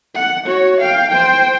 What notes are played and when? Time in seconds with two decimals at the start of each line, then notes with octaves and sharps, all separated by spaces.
0.15 F#5
0.46 F#4 C#5
0.80 F5 G5
1.10 C5 G5